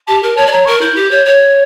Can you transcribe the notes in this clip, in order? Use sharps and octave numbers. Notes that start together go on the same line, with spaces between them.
G4 A5
A#4
C#5 A5
D5
C#5 A#5
A#4 C#6
E4 G6
G4
C#5
C#5